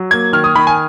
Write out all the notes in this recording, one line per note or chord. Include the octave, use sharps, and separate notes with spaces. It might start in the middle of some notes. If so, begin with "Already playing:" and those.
Already playing: F#3
A#3 G#6
D#3 F6
D#6
D#3 B5
G#5